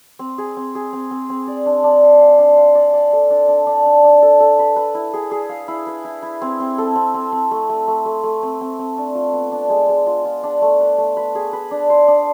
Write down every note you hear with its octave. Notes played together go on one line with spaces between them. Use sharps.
C4
G#4
C4
G#4
C4
C4
C4
D5
D4
D4
F5
F5
D4
F5
D5
D5
A4
D4
D4
D4
D4
D4
A4
A4
B4
B4
E4
G#4
G#4
F5
E4
B4
E4
E4
C4
C4
A4
C4
C4
C4
A3
A3
A3
A3
A3
C4
C4
C4
D4
F4
B3
D4
G#3
G#3
F4
F4
D4
A3
B4
A3
B4
G#4
B4
D4
C5
D4